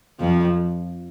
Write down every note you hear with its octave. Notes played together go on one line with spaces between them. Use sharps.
F2 F3